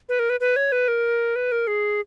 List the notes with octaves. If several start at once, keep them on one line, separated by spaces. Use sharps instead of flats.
B4
A#4
B4
B4
C#5
B4
A#4
B4
A#4
G#4